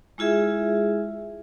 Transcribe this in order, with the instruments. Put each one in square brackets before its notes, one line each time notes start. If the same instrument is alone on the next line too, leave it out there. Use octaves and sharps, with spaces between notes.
[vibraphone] G#3 E4 F4 G#4 E5